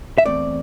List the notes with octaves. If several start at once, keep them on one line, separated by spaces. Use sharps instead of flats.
E5
E2 D3 A3 C4 D5